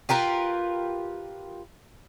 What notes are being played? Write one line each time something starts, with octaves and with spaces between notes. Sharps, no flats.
F4 G4 A#4 B4